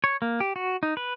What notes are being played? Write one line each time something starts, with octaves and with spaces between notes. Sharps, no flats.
C#5
A#3
G4
F#4
D#4
B4